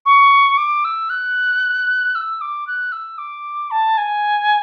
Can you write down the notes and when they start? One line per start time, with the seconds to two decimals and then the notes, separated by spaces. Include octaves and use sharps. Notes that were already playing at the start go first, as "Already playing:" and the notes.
0.06 C#6
0.57 D6
0.84 E6
1.10 F#6
2.15 E6
2.41 D6
2.67 F#6
2.92 E6
3.18 D6
3.71 A5
3.97 G#5